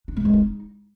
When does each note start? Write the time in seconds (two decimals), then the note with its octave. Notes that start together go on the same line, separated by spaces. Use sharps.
0.08 D4
0.17 A3
0.25 G#3
0.34 D#4